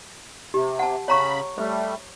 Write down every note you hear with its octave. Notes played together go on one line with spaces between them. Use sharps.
C3 G4
F#5 A5
C#3 C#5 A#5 B5 C#6
G3 A3 C5